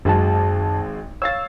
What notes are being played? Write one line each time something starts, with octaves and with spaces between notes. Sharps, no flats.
G#1 F#2 G#3 F#4 A5
C#5 F5 E6 A6